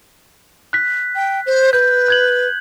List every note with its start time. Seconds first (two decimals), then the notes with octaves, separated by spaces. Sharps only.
0.73 F#6 B6
1.15 G5
1.46 C5
1.73 B4 G6
2.08 F#6 G#6 F#7